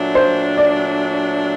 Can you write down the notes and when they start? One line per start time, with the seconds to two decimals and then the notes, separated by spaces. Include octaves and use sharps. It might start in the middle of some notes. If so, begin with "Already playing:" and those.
Already playing: A#2 F#3 A3 D4
0.15 C5
0.57 D5